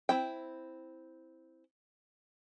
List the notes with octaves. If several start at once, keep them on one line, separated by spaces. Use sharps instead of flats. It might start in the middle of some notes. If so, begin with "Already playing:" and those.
C4 E4 G5